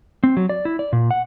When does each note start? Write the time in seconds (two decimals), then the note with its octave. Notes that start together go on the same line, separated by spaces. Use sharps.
0.24 C4
0.37 F#3
0.49 D5
0.65 E4
0.79 D5
0.93 A#2
1.11 F#5